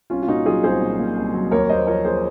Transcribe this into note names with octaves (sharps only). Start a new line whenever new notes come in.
C2 C#4 F4
F4
A#2 D#4 F#4
F#3 F4 G#4
C2 G#4 C5
A#2
A#2
C2
F#3
D#2 A#4 C#5
D#2 C5 D#5
F3 A#4 C#5
A#3 G#4 C5